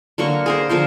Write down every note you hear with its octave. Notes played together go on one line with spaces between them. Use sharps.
D3 F#3 A#3 C#6
G#4 A#4 C5
D3 F3 A#4 C5